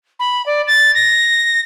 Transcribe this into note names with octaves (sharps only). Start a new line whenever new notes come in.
B5
D5
A6
A#6